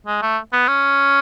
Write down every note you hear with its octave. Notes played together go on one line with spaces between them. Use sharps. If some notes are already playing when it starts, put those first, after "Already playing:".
G#3
A3
B3
C#4